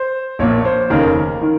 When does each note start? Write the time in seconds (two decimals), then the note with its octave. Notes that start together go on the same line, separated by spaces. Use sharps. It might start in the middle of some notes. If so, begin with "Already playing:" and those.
Already playing: C5
0.39 A#1 A#2 C#5
0.65 C5
0.90 F1 D#2 C#3 A#4
1.41 D#3